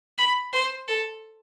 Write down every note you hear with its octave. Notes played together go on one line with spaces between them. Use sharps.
B5
C5
A4